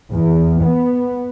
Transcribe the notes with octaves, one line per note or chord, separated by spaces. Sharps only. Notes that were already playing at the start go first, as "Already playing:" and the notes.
E2
B3